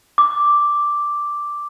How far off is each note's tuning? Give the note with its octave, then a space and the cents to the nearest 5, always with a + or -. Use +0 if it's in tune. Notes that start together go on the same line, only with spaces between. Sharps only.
D6 +0